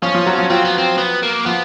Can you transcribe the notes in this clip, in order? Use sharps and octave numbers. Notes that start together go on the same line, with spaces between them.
F3 C#4 F4
F3 F4
F#3 F#4
F3 F4
F3 C4 F4
B3
C4
B3
A#3
F3 B3 F4